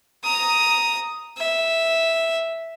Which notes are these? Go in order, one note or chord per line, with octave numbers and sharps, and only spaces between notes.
A#5 D#6
E5